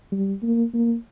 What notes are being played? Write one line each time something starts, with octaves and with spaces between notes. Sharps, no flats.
G3
A#3
A#3